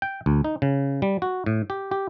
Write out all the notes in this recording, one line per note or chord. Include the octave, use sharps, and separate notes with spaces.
G5
D2
D#4
C#3
G3
F#4
A2
G4
G4